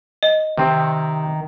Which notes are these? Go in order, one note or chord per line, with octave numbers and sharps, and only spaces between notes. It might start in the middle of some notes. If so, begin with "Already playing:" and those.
D#5
C3 D#3 C4